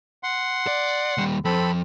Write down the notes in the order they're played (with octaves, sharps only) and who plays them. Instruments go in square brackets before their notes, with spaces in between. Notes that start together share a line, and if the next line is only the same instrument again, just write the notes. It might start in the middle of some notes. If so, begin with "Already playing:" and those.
[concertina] F#5 C6
[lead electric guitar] D5
D#2 G3
[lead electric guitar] F2 [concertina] C4 A4 B5